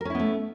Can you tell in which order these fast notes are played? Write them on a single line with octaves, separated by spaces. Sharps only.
A#4 C#4 E4 B3 A3